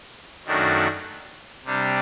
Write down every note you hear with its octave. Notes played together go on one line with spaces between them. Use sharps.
F#2 D#3 A3 D4 F#4
C3 G3 D4